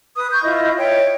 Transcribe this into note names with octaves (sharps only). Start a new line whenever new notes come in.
B4 D#6
C#6 G6
E4 F4 D#5
C#5 E5 G5